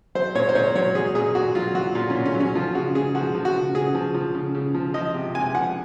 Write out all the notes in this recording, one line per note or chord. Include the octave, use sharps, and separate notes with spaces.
F#3 C5
A#2 C#5
C5
A#2 C#5
F#3 C#5
F#3 G#4
A#2 G#4
A#2 F#4
F#3 F4
F#3 F#4
A#2 F4
A#2 C#4
C#4
F#3
C#4
F3 F4
C#3 F#4
C#3 G#4
F3 F#4
F3
F#4
C#3
C#3 G#4
F3
F3
C#3
C#3
F3
F3 D#5
C3
C3 G#5
F3 F#5